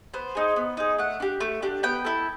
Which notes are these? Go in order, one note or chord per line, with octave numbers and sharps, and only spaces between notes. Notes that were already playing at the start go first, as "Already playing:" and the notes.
B3 C5
D#4 G#4
B3
D#4 G#4
A3 F#5
D4 G4
A3
D4 G4
B3 G5
E4 A4